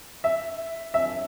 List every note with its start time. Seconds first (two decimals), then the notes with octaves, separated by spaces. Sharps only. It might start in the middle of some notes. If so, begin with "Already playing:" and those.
0.24 E5
0.94 E5